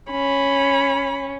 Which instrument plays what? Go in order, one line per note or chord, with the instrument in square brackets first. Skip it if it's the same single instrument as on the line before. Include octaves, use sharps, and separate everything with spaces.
[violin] C#4 [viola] B5